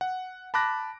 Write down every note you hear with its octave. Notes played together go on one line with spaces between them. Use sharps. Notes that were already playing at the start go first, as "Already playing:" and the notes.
F#5
A5 B5 D6 F#6 A#6